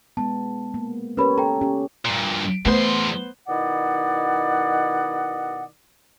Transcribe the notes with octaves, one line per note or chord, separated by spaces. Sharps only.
G#3 B3 A5
A#3
C#4 G4 A#4 B4 C#5 B5
A4 G5 A#5
C#4 G4
G2 A#2
E2 A3 B3 C5 C6
B2 D#3 E4 D5 D#5 F#5